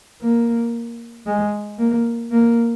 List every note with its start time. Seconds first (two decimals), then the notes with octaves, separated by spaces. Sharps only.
0.22 A#3
1.26 G#3
1.79 A#3
2.31 A#3